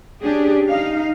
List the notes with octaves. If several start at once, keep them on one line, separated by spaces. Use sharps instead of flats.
C#4 D4 G4 G#4
D#4 F5